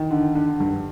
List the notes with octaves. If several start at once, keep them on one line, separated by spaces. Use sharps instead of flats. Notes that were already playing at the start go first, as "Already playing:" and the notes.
Already playing: D#3
D3
D3
G2